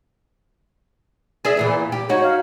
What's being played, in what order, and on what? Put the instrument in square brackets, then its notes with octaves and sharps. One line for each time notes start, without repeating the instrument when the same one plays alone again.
[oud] G#4 D5 E5
E2 A#2 E3
G4
[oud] D#4 F#4 [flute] C#5
[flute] F5